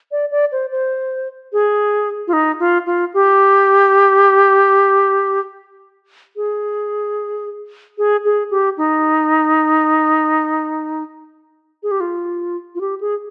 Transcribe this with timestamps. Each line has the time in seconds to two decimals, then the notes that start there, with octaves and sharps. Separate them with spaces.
0.12 D5
0.31 D5
0.52 C5
0.72 C5
1.53 G#4
2.27 F4
2.33 D#4
2.60 F4
2.86 F4
3.14 G4
6.36 G#4
7.98 G#4
8.25 G#4
8.51 G4
8.77 D#4
11.83 G#4
11.91 G4
12.00 F4
12.75 F4
12.81 G4
13.01 G#4